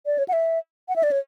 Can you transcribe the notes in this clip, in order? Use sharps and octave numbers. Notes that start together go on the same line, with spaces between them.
D5
C#5
F#5
E5
F#5
E5
D5
C#5